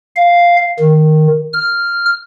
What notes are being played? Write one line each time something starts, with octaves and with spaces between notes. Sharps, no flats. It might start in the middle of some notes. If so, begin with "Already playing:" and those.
F5
D#3
F6